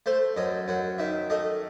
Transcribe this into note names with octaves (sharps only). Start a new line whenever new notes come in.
A3 C5
F#2 D#5
F#2 F#5
D#3 E5
A3 D#5